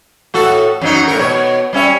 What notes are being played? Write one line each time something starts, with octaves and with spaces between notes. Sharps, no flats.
A2 F#4 A4
F#2 F#3 D#4
A2 A#4
B2 C#5
G3 C#4 E5